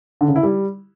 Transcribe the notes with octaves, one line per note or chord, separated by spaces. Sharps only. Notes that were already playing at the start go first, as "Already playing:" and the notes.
D3
C#3
E4
G3